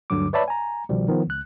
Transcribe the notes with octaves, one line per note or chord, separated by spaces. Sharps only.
D2 G2 D3 F#3 D6
B4 C#5 D5 E5 A5 B5
G#5 A#5
C2 B2 D#3 F3 G3
D#3 F3 B3
C#2 F#6